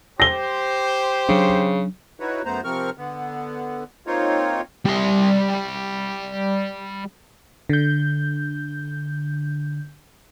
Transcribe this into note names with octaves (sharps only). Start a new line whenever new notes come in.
G4 C5 A#6 G7
C#3 F#3 D4
D#4 E4 F#4 B4 C#5
F#2 A3 B3 C5 A#5
C3 F3 C4 A#4 C#6 F6
D3 B3
A#3 C4 D#4 F4 C#5
G3 C6
D3 G6